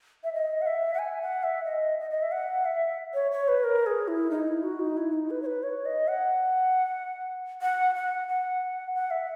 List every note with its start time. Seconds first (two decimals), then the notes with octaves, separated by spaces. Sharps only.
0.24 E5
0.33 D#5
0.62 F#5
0.66 E5
0.94 F#5
0.99 G#5
1.22 F#5
1.43 E5
1.65 D#5
1.99 D#5
2.10 D#5
2.22 E5
2.32 F#5
2.65 E5
3.14 C#5
3.32 C#5
3.48 B4
3.64 A#4
3.86 G#4
4.08 E4
4.31 D#4
4.48 E4
4.63 F#4
4.80 D#4
4.97 E4
5.13 D#4
5.30 B4
5.42 C#5
5.46 B4
5.63 C#5
5.86 D#5
6.08 F#5
7.62 F#5
7.95 F#5
8.28 F#5
8.95 F#5
9.11 E5